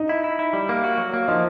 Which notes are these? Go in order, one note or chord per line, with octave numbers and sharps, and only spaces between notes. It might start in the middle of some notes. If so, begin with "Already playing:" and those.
Already playing: D#4 D#5
E4
E4
E4
G3
A#3
F#4
F#3
A#3
F3 D#4 D#5